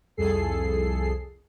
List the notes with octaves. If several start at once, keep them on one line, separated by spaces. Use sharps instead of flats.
C2 F2 G#4 A4 C7